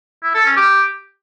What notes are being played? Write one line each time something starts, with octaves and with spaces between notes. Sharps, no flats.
E4
A4
C#4
G4